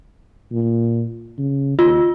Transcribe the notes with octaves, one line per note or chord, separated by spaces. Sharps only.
A#2
C#3
D#2 F4